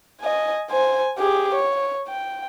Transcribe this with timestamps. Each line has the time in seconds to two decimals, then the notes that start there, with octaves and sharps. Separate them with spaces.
0.21 D#5 G#5
0.70 C5 G#5
1.19 G4 G#4
1.54 C#5
2.08 G5